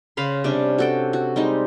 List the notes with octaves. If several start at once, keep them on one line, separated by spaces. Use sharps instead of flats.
C#3 F5 B5 C6
C3 G3 C#4 D4
F#4 A4 G5
F#4
G3 G#3 C4 D#4